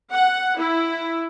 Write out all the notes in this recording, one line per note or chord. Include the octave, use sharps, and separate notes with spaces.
F#5
E4